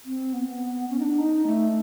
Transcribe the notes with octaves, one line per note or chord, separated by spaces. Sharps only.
C4
B3
B3
C#4
D#4
D4
D#4
A3